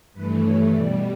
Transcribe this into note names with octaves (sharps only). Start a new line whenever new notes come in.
G2 E3 A3 B4
C#5
B2 G3 D5